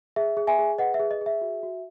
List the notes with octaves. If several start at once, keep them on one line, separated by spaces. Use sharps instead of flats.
G#4 E5
G#4
E5 G#5
G#4
B4 D#5 F#5
E5
G#4
D#5
G#4
E5
F#4
F#4